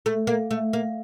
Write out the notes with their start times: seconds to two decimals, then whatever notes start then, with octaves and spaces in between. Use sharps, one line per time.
0.06 A3
0.27 A#3
0.51 A3
0.73 A#3